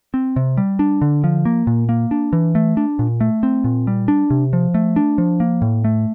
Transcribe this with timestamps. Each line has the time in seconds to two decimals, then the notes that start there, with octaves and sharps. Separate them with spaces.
0.14 C4
0.36 C3
0.57 G3
0.79 D4
1.02 D3
1.24 F3
1.45 A#3
1.67 A#2
1.89 A#3
2.11 D4
2.33 E3
2.55 A3
2.77 D4
2.99 A#2
3.21 A3
3.43 C4
3.64 A#2
3.87 G3
4.08 D4
4.30 C3
4.53 F3
4.74 A3
4.96 D4
5.18 F3
5.40 A#3
5.62 A2
5.84 A3